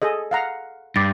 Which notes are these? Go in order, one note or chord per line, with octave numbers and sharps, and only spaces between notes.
G#4 A4 D#5
F5 F#5 A#5
G2 D6 A6